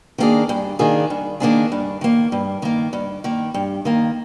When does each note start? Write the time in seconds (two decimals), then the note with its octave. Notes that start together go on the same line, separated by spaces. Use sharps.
0.18 D#3 A#3 D4 G#4
0.49 G2
0.79 D#3 A#3 D4 G#4
1.10 G2
1.40 D#3 A#3 D4 G#4
1.72 G2
2.01 D#3 A#3
2.32 G2
2.62 D#3 A#3
2.93 G2
3.24 D#3 A#3
3.54 G2
3.85 D#3 A#3